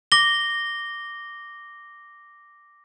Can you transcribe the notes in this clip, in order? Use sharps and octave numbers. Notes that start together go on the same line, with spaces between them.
D6 A#6 G7